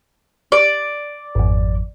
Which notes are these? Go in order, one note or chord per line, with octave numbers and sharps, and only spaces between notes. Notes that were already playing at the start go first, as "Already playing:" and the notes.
D5
G#1 F2